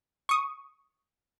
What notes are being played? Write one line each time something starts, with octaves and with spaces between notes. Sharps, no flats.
C#6 D#6